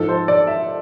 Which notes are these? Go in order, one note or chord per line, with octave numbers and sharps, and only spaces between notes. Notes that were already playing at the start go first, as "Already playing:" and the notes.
Already playing: G#2 F3 A4
C5
D5
E5